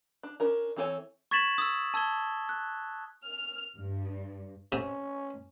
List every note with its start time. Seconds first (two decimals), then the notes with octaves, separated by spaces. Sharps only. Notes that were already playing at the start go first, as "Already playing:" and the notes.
0.23 D4
0.40 C#4 D4 A#4 A#5
0.77 E3 C4 A4 C#5 G#5
1.31 C#6 G#6 A6 B6 E7 F#7
1.58 D#6 E6
1.94 A5 E6 G#6 G7
2.49 F#6
3.25 F6
3.78 G2
4.72 C3 C#4